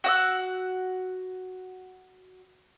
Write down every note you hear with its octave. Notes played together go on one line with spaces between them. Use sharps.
F#4 F#5 E6